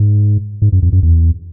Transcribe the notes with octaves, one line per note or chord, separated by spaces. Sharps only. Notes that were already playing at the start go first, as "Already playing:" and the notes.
Already playing: G#2
G#2
F#2
F2
F#2
E2